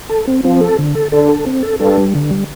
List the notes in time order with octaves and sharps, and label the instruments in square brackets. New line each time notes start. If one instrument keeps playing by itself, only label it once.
[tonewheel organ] A4
C4
[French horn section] F3 [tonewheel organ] C4
[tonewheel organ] A4
D3
A4
[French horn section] D3 [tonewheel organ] A4
[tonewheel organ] A4
C4
A4
[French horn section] G2 [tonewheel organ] A4
[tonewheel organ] G3
D3
G3